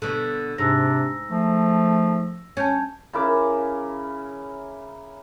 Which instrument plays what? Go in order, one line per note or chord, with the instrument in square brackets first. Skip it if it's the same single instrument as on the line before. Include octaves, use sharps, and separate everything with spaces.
[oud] B2 D3
[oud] G#2 [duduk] C3 [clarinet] D4 [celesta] E6 A#6
[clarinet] F3 [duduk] A3
[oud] C#4 [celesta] A5 G6 G#6
[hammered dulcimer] C#3 E4 A#4 D6